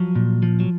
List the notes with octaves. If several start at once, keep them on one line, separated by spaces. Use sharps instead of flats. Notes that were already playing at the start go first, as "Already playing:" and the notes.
Already playing: F3 F#3
A#2
F3
F#3